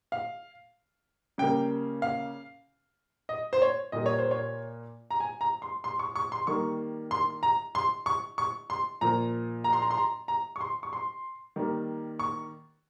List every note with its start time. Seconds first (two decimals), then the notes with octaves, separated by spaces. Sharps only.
0.12 F5
1.38 C#3 G3 A#3 G5
2.02 F5
3.29 D#5
3.53 C5
3.62 C#5
3.92 A#2 G3 A#3 D#5
4.06 C#5
4.19 C5
4.31 C#5
5.11 A#5
5.20 G#5
5.41 A#5
5.62 C6
5.84 C6
5.99 C#6
6.16 C#6
6.32 C6
6.47 D#3 G3 A#3 C#6
7.11 C6
7.43 A#5
7.75 C6
8.06 C#6
8.38 C#6
8.70 C6
9.01 A#2 F3 A#3 A#5
9.64 A#5
9.73 C6
9.82 A#5
9.91 C6
9.98 A#5
10.28 A#5
10.56 C#6
10.61 C6
10.83 C#6
10.93 C6
11.56 D#3 G3 A#3
12.19 C#6